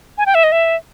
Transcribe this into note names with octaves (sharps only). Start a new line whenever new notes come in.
G#5
G5
E5
D#5
E5